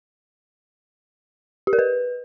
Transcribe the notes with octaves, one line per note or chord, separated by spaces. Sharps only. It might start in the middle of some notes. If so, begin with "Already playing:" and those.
G4
A#4
B4